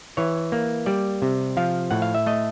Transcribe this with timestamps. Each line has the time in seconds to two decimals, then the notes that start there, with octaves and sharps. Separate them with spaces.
0.17 E3 C#5
0.52 A#3
0.86 G3 D5
1.22 C3
1.57 F3 F5
1.91 A2 F#5
2.02 F5
2.15 E5
2.26 A3 D#5